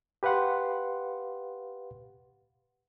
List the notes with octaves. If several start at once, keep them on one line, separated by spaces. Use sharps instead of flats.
G4 B4 F5 F#5 C6